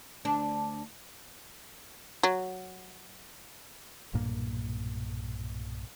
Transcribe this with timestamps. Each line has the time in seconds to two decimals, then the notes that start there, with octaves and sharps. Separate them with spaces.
0.25 D2 D4
2.23 F#3
4.14 B1 G2 A#2 A#3